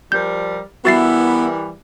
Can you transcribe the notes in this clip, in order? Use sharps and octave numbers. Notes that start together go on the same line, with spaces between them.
F3 G3 A#4 G6
E3 G3 B3 E4 F#4 A#4 A6 C7